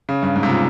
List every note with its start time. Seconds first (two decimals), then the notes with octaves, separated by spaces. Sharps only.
0.09 C#3
0.22 G2
0.36 G#2
0.43 C3
0.48 A#2